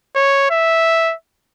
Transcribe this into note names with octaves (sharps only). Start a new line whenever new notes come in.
C#5
E5